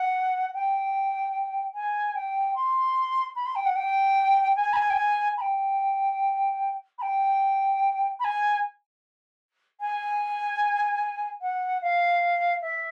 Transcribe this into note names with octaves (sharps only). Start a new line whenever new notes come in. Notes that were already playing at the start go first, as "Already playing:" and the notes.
Already playing: F#5
G5
G#5
G5
C6
B5
C6
G5
F#5
G5
G#5
B5
G#5
G5
G#5
B5
G5
B5
G5
B5
G#5
G#5
F#5
F5
E5